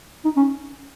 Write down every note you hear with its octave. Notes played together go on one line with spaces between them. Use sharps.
D#4
C#4